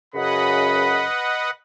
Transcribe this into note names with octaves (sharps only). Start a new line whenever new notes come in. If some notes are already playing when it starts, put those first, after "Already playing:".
F#2 C#3 B4 D#5 F#5 B5